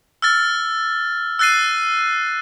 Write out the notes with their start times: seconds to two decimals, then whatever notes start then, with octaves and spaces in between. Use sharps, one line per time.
0.22 E6 F6 A6
1.39 E6 F#6 A6 C7 D#7